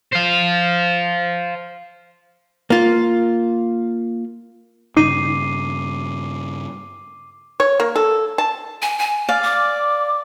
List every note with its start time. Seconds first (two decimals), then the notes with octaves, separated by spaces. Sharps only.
0.12 C5 F5
2.70 A#3 F4
4.97 G2 C#3 D#4 D6 C7 D#7
7.60 C#5
7.80 A#3
7.96 A4
8.38 A5
8.82 G#5
8.99 G#5
9.29 D5 F5
9.43 D6